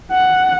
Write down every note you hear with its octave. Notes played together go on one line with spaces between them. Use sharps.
F#5